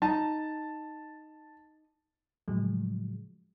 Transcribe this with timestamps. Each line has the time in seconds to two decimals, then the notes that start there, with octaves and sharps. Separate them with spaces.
0.02 D#4 A5
2.48 A2 C#3 F3 F#3 G#3